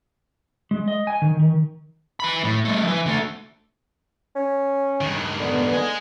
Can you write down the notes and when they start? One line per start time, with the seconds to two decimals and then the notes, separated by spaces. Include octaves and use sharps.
0.71 G#3
0.88 D#5
1.07 G#5
1.22 D#3
1.39 D#3
2.20 E3 B5
2.44 A2
2.65 G3 A3
2.83 E3 F3
3.06 D3 A3
4.35 C#4
5.01 G2 D#3
5.39 D3 B3
5.73 D#5 G#5